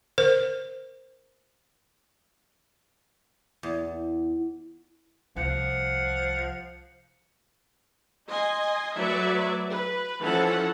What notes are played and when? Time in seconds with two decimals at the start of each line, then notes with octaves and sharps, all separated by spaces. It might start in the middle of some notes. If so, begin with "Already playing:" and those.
0.18 A#4 C5
3.63 E2
5.36 C2 F3 F#5
8.26 D#5 G#5 C6
8.95 F#3 A3 F#4 B4 D5 E5
9.69 B4
10.21 E3 F3 C#4 A4 F#5 A5